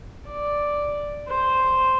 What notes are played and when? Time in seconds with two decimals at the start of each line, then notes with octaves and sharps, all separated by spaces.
0.28 D5
1.29 C5